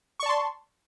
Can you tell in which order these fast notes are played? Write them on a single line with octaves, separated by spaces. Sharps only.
C#6 D5 A5 C6